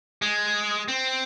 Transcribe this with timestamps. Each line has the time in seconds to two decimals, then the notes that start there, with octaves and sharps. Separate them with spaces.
0.22 G#3
0.88 C4